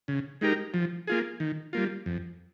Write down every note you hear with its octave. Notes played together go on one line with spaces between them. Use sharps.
C#3
G#3 D#4 G4 A#4
F3
A#3 F4 G#4
D#3
G3 A#3 F4
F2